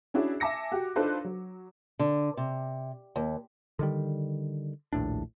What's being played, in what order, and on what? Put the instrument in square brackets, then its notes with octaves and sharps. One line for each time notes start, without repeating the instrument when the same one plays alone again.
[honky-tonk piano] C#4 D4 E4 F#4 G#4
E5 G#5 A5 D6 A#6 C#7
F#4 G4
D4 D#4 F4 A4 B4 C5
F#3
[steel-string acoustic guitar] D3
C3
D#2
[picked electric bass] D3 D#3 G3
A#1 D#2 A2 D4